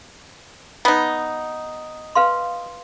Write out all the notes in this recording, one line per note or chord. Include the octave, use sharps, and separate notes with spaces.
B3 D#4
B4 F5 C6